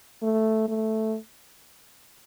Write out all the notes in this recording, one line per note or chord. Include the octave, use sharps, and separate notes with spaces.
A3
A3